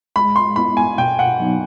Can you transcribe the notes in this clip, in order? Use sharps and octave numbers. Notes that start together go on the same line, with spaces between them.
G#3 B5
C6
B3 E4 B5
G#5
B2 G5
F#5
F#3 B3 D#4